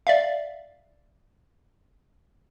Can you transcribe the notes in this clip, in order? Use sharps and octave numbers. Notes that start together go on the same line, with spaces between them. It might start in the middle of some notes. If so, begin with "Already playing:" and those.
D5 E5 F5